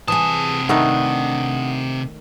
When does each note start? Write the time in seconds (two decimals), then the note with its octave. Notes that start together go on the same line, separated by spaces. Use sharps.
0.08 C3 E3 G#4 A5 D#6
0.69 D#3 A3 D4 D#4 B4 F#5 D#6